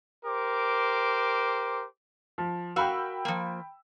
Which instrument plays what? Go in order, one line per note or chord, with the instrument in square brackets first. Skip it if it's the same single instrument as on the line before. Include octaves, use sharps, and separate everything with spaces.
[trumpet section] G4 A#4 C5 D6
[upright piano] F3
[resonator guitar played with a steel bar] F#4 A#4 F5 [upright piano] G5 B5 E6
[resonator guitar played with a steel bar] F3 A#3